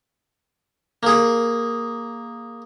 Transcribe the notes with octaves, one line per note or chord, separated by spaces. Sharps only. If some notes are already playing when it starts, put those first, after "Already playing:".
A#3 G#4